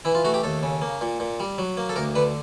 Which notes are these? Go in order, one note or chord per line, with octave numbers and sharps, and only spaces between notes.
E3 E4
F4
A3 F#4
G4
D#2 A4
C#3
A#3
A#2
A#2
G3
F#3
A#3
A4
D2 A#4
D3 B4